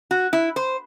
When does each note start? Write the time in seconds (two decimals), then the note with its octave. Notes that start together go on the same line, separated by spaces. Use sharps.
0.11 F#4
0.33 E4
0.56 C5